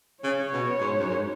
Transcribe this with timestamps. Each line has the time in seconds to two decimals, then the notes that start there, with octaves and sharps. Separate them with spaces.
0.24 C#3 C#5
0.53 B2
0.80 G#2
0.99 F#2
1.09 G#2